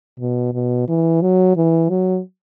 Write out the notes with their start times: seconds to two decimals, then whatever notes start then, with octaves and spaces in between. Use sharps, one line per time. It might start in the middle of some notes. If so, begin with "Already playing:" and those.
0.19 B2
0.53 B2
0.88 E3
1.21 F#3
1.56 E3
1.89 F#3